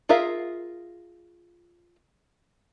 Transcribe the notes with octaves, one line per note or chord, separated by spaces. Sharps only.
F4 G#4 A#4 E5 F5